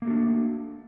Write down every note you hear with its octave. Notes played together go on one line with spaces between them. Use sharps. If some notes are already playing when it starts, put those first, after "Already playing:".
A3 A#3 D4 F#4